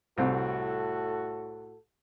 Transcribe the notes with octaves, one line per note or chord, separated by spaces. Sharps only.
C2 A2 C4 F#4 A4